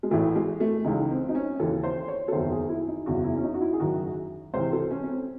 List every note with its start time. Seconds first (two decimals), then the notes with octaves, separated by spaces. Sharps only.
0.03 G#3
0.11 A1 A2 E3 A3
0.36 G#3
0.60 A3
0.85 C#2 C#3 E3 D#4
1.10 C4
1.29 D#4
1.35 C#4
1.59 D#2 C#3 E3 A4
1.83 C5
2.08 C#5
2.28 A4
2.32 F#1 E2 D#3 C5
2.51 G#4
2.69 E4
2.88 D#4
3.06 F#1 E2 C#3 F#4
3.24 E4
3.37 C#4
3.44 D#4
3.54 F#4
3.61 E4
3.73 G#4
3.80 F#1 F#2 D#3 F#4
4.53 C#2 C3 E3 C5
4.73 A4
4.91 C#4
5.03 C#4
5.09 C4